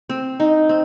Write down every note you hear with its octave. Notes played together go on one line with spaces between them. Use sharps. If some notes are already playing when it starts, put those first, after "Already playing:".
C4
D#4
C4